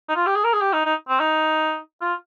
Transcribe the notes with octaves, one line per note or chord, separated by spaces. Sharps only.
D#4
F4
G4
G#4
A#4
G#4
G4
D#4
D#4
C4
D#4
F4